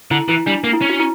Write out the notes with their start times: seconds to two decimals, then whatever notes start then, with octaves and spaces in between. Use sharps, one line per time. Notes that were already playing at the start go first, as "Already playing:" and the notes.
0.11 D3 E4
0.28 E3 E4
0.46 G3 D4
0.64 A#3
0.73 E4
0.81 C#4
0.90 F#4
1.00 E4